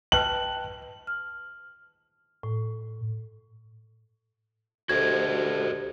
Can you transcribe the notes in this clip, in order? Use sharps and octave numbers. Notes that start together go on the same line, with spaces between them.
B4 D#5 G5 A5 F#6 F#7
F6
A2
D2 F#4 G4 A4 A#4 C5 D#5 G#6